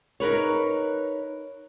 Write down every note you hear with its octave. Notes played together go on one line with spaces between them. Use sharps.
D#4 A#4 B4 C#5